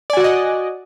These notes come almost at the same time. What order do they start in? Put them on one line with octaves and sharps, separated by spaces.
D5 G#5 F#4 F#5 D#5